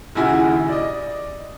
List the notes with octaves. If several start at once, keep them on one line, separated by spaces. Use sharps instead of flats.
A#1 D#2 C#3 E4 F#4 G#5
D5 D#5